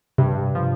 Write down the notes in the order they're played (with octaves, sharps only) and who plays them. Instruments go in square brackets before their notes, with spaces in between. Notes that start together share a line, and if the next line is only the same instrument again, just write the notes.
[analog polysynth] G2 [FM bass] C3
[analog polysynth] F3